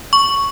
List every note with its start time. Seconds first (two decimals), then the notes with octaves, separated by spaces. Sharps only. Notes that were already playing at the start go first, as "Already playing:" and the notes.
0.13 C#6